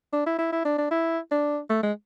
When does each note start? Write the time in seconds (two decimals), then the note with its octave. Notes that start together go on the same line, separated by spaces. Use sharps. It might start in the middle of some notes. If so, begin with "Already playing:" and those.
0.13 D4
0.26 E4
0.38 E4
0.52 E4
0.65 D4
0.78 D4
0.91 E4
1.31 D4
1.70 A3
1.83 G#3